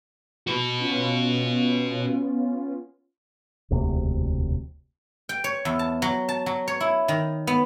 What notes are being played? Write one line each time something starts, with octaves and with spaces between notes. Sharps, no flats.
F#4 B4
B3 C#4 F4
E1 D2 C3
G5
C#5
E2
A5
F#3
A5
F#3
C#5
E4
D#3
B3